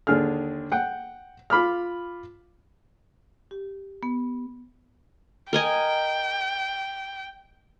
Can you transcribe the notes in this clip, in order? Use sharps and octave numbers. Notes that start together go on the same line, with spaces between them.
D#2 D3 D4 G#4 F6
F#5 G5
F4 B5 D6 F6
G4
B3
A#4 D#5 G5 G#5